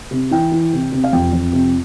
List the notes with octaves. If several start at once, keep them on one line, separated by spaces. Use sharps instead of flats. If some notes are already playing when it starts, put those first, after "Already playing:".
C3
E3 G5
E3
C3
C3
F5
F2 G5
F2
C3